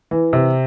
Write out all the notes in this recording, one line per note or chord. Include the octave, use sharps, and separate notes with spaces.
E3
C3